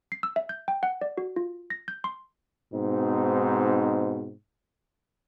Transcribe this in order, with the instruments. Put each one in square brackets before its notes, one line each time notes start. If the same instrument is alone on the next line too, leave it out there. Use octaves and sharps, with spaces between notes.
[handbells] C7
E6
E5
G6
G5
F#5
D5
F#4
F4
A#6
G6
C6
[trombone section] G#2 B2 C4 D#4